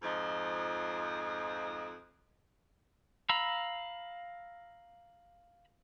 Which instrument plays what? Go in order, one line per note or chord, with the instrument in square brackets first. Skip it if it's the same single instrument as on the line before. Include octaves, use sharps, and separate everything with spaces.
[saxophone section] F2 G#2 F3 D#5
[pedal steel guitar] F5 A#5 B5 E6